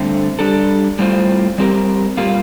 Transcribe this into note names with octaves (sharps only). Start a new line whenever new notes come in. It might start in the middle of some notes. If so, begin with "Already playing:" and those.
Already playing: G2 D3 A3 C4
G3 D4 A4
A2 G3 C4 F4 C5
G3 C4 G4 A#4
A#2 G3 A#3 F4